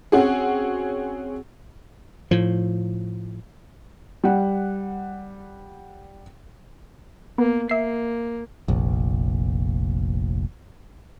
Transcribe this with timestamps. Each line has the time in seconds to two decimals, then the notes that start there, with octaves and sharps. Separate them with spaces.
0.12 C4 C#4 F#4 G#4
2.31 A2 F3
4.24 G3 F#5
7.38 A#3 B3
7.69 A#3 E5 C7
8.68 F1 A#1